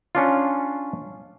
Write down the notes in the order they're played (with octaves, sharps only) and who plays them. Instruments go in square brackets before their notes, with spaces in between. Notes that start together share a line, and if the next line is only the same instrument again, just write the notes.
[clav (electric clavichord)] C#4 D4 F4